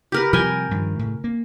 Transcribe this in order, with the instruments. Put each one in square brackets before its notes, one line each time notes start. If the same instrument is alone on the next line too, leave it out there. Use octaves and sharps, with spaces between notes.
[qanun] G4 A#4 B4
[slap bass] C3 F3 G3 [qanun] A#4 G5 G#5
[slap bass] G2 D#3 F3
A2 C#3
A#3